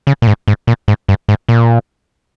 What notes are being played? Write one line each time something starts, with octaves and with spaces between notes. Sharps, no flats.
C#3
A#2
G#2
G#2
A#2
G#2
G2
G#2
A#2